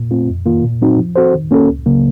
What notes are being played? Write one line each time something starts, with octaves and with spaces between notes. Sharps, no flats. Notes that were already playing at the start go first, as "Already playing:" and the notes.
Already playing: A#2
A3 C4 F4
F2
D#3 A#3 F4
A#2
F#3 C4 D#4 F#4
F3
C4 F#4 A4 C5
D#3
A#3 C#4 F#4 A4
C#2
C#3 F#3 A#3